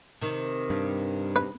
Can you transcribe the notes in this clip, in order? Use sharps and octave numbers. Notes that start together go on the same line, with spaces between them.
C3 D#3
G2
B4